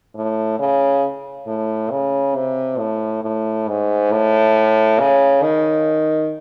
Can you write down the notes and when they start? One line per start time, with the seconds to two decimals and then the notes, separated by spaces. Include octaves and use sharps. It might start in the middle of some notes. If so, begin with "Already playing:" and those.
0.15 A2
0.59 C#3
1.47 A2
1.91 C#3
2.35 C3
2.79 A2
3.23 A2
3.68 G#2
4.12 A2
5.00 C#3
5.43 D#3